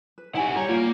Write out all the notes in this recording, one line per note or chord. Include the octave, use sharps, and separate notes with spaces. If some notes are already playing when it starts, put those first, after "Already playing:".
B4
D#4 E4 G4 F#5 G#5
G3 C#5 A#5
A#3 F4